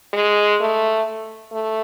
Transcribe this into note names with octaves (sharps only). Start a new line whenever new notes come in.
G#3
A3
A3